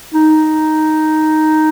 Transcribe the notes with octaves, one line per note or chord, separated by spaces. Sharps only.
D#4